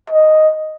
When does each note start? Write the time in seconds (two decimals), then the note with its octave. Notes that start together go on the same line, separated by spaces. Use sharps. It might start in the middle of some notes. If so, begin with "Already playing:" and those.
0.10 D#5